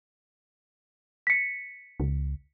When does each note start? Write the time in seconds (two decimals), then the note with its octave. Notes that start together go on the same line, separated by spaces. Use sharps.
1.27 B6 C#7
2.00 C#2